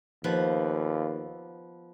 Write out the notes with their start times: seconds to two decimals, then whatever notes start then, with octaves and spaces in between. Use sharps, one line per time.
0.24 D#2 F3 B3 B4